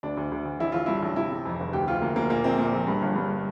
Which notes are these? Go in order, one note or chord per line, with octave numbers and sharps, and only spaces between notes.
D2 D4
D2
D2
D2
A1 E4
A1 F4
G2 E4
A1
C3 E4
C3
F2
F1
D2 G4
D2 F4
D2 A#3
D2 A#3
A#2 A#3
A#1 C4
A#2 A#3
A#1
G2
G1
G2